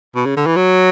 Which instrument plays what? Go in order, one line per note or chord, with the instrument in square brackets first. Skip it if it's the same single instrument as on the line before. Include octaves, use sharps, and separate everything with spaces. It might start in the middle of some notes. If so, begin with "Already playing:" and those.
[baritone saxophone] B2
C#3
D3
E3
F#3